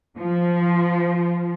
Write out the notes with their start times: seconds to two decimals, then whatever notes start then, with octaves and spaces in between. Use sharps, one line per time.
0.18 F3